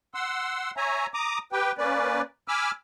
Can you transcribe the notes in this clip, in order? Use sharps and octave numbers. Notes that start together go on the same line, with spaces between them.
F#5 C6 E6
C#5 E5 G#5 A#5
A#5 D6 D#6
G4 B4 G5
A#3 C#4 B4 D5
G#5 B5 D6 E6 F6